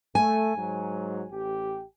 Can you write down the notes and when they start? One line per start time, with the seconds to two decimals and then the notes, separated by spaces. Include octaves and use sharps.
0.15 A3 G#5
0.55 G#2 F#3
1.30 A1 G4